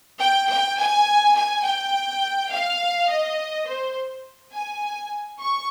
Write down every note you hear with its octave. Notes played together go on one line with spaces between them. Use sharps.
G5
G5
G#5
G#5
G5
F5
D#5
C5
G#5
C#6